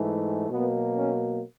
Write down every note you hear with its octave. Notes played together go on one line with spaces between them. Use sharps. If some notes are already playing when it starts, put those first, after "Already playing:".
Already playing: G#2 E3 A3
B2 F#3 A#3 B3
C#4